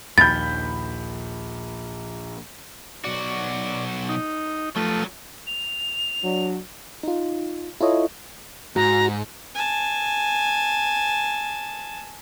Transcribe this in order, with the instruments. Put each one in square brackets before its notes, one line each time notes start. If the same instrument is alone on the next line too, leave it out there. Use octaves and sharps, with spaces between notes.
[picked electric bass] A#1 [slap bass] D#2 [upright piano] B5 G6 [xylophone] A6
[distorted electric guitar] B1 F#4 [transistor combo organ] D5
[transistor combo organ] D#4
[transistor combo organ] F3 A3 [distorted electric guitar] F#3 B4
[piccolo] F7
[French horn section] F#3 D4
[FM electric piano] D#4 F4
E4 F4 A4 C#5 D#5
[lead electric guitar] G#2 [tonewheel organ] F#4 [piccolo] A#5
[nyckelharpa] G#5 A5